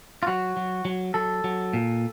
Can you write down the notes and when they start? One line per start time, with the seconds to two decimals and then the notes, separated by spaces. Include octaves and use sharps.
0.23 F4
0.27 F#3 F#4
0.57 F#3
0.85 F#3
1.14 F#3 A4
1.44 F#3
1.73 A#2